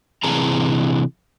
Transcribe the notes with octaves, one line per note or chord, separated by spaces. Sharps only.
C3 E3 G#4 A5 A#5